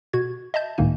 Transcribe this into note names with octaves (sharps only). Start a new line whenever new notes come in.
B2 F#4 G#6
D#5 E5 A5 G6
C#2 A2 D#3 A#3 D#4 G#5